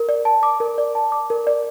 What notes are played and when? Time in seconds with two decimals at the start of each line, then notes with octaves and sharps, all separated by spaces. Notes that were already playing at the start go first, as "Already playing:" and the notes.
Already playing: A#4
0.09 D5
0.25 A5
0.43 D6
0.60 A#4
0.78 D5
0.95 A5
1.12 D6
1.30 A#4
1.47 D5